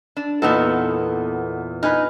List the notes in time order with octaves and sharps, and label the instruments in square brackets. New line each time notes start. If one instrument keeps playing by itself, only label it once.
[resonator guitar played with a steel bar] D4
[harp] E2 A#2 [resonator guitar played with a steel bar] B3 D#4 A4
[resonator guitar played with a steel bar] D#4 [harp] B4 G#5 F6